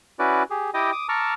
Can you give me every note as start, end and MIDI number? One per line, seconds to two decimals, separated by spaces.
0.19 0.43 61
0.19 0.43 64
0.19 0.43 66
0.19 0.43 71
0.19 0.43 74
0.50 0.70 67
0.50 0.70 68
0.74 0.91 64
0.74 0.91 67
0.74 0.91 75
0.74 0.91 79
0.74 0.91 86
0.74 0.91 87
0.92 1.07 86
0.92 1.07 87
1.09 1.34 81
1.09 1.34 82
1.09 1.34 85
1.09 1.34 86
1.09 1.34 88
1.09 1.34 89